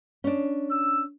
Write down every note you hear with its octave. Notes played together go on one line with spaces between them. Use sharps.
C#4 D4
E6